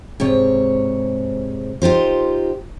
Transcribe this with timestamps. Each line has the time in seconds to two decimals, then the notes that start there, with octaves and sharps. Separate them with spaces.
0.20 G#2 C3 C#5
1.82 D#4 F4 G4 C5